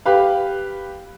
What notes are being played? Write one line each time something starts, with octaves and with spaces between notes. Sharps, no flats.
G4 B4 F5